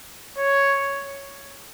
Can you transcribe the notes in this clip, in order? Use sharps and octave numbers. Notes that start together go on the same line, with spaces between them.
C#5